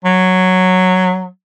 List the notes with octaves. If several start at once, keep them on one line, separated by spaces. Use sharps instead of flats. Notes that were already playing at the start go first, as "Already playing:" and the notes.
F#3